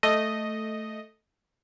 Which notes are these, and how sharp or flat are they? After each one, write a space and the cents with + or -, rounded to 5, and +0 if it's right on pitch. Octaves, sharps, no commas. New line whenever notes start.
A3 +0 D#5 +0